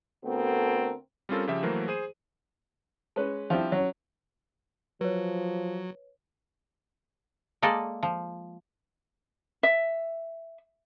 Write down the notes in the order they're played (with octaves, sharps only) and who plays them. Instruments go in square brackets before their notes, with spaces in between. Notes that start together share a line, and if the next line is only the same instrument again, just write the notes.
[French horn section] D3 A3 B3 C4 F#4 A#4
[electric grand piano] G3 C4 C#4 F4 A4 A#4
C#3 F3 G4 E5
E3 F#3 A3 A#3 A#4 C5
G#4 C5 D#7
[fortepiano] G#3 C#4 B4
F3 G3 C4 D4 E4 G4
F#3 C#4
[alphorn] F3 [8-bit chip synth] F#3 [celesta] B4 C#5
[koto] G#3 A#3 A4 D5 D#5
F3
[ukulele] E5